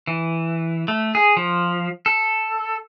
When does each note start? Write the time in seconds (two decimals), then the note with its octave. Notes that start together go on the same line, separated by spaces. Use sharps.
0.07 E3
0.88 A3
1.15 G#4
1.37 F3
2.06 A4